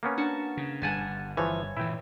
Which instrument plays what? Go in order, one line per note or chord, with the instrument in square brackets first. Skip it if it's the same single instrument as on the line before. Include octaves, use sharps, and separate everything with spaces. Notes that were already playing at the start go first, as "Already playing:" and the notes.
[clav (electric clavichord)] A#3 B3 C#4
[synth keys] D4 [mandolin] F#4 A5
[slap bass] C#3
[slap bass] G1 G2 [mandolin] F#5 G#5 A5
[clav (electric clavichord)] E3 F3 [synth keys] B4 [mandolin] C#5
[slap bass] A#2 E3 [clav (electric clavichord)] E4 G5